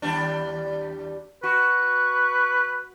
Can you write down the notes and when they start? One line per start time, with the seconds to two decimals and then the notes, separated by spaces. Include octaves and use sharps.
0.02 D#2 G3 D4
1.43 F#4 B4 C#6